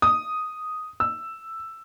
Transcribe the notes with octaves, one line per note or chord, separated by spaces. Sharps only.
D#6
E6